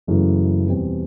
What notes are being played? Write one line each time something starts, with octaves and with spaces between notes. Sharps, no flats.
F#1 F#2 C#3 E3 A3
E2 B2 G3 C4